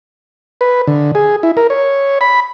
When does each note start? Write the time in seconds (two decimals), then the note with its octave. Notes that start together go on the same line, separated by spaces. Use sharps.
0.61 B4
0.87 D3
1.15 G#4
1.43 E4
1.57 A#4
1.70 C#5
2.21 B5